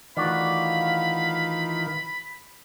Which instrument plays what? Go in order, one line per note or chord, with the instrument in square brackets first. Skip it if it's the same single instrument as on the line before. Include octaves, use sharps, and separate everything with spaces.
[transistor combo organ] D#3 E3 F4 [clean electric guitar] A3 F#4 D5 [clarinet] F5 [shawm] B5